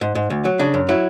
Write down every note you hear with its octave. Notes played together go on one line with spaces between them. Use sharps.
G#2
G#2
D2
F#3
C#3 D4
F#2
F#3 E4